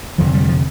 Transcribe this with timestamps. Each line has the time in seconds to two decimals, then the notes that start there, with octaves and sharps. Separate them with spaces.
0.18 F1 F2 D3 F3
0.34 G3
0.44 G3
0.49 F3